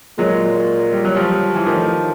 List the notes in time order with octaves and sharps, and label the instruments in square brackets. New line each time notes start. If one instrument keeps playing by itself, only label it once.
[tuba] A#2 [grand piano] F#3 G#3
[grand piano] G3
F#3
F3 G3
E3
[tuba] A2 [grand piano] D#3 F3